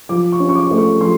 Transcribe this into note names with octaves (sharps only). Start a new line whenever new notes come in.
F3 D6
C#6
C#4
C#6
D6
A3
C#6
F3 C6